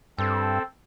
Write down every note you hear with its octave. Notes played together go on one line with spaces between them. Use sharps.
G2 C4 A4